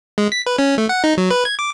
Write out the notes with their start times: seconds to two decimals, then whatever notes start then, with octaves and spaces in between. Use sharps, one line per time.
0.18 G#3
0.32 B6
0.46 B4
0.59 C#4
0.78 A3
0.89 F#5
1.04 D#4
1.17 F#3
1.31 B4
1.45 G#6
1.59 D6